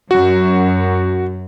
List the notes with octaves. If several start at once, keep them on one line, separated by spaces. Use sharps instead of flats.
F#2 F#4